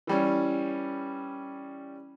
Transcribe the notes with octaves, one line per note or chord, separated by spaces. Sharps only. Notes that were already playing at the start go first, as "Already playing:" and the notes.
E3 G3 C#4